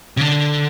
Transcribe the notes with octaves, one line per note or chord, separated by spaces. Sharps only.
C#3
D3